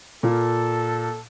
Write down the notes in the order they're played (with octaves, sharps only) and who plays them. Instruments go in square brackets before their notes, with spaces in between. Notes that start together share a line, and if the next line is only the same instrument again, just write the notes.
[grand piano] A#2 A#3 [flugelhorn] A4